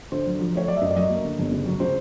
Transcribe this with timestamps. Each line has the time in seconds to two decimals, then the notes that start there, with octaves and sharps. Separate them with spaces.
0.12 D3 C5
0.27 F#3
0.39 F3
0.55 A3 C#5
0.68 F#3 D5
0.77 E5
0.82 F#2 D#5
0.91 D5
0.96 F#3 D#5
1.10 A#3
1.25 D3
1.39 G1
1.52 C#3
1.66 F#3
1.80 C#3 C5